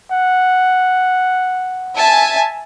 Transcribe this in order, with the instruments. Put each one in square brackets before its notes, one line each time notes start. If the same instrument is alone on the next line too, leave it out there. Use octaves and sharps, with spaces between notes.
[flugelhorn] F#5
[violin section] E5 G#5 A5